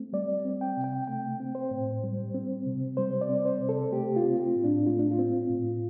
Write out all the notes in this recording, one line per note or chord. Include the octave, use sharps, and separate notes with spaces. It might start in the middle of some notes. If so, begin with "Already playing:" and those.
Already playing: A3 C4
G3 D5
C4
G5
C3
G5
A3 G5
C4
C5
A2
G3
C4
C3
G3 C5
D5
C4
C5
C3
A4
A3 G4
F4
C4
F4
A2
D4
A3 F4
D4
F4
C4
A2